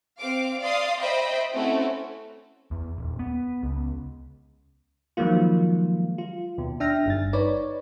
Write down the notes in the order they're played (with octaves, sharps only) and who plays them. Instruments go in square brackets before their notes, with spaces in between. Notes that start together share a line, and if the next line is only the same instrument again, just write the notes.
[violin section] C4 F5 D6
D5 F5 C6 D#6
C5 D#5 E5 G5 B5
A3 C4 C#4 E4 F#4
[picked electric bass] E2
D#1
B3
C#2
[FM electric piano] D#3 F3 F#3 G#3 A#3 F4
F4
D#2 B2
D4 E5 G5 F6 A#6
G1 G2 A6
D#4 B4 C#5 D5